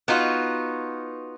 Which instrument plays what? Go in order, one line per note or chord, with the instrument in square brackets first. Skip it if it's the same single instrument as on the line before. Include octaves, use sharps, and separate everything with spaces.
[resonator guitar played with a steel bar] B3 D#4 F4 F#4